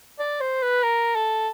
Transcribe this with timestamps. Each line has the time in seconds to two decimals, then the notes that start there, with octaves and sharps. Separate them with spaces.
0.19 D5
0.40 C5
0.62 B4
0.83 A#4
1.15 A4